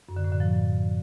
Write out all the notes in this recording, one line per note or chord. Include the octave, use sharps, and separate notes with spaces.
F#2
D3
A2
D3
F3